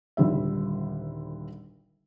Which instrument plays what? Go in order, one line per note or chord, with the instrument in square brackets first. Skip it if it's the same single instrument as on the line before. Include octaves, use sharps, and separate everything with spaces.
[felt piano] D#1 G#1 D3 G3 E5